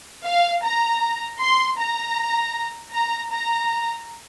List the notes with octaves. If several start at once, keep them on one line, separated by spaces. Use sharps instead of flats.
F5
A#5
C6
A#5
A#5
A#5